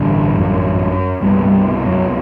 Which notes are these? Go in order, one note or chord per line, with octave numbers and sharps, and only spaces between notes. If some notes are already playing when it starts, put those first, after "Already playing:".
Already playing: A1 G2 D3
F#2 F#3
C2 G2 B2 G3
G2 G3
F#2 F#3